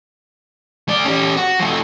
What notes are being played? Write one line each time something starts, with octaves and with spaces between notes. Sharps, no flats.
A3 D5
C#4 G4
F#4
F3 A3